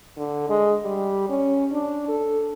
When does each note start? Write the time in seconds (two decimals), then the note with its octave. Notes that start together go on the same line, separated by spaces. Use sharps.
0.17 D3
0.49 G#3
0.85 G3
1.29 C#4
1.72 D4
2.09 A4